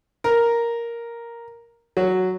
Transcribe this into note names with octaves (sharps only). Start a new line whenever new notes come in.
A#4
F#3